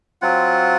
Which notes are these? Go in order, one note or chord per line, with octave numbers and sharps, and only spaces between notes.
F#3 C4 F4 F#5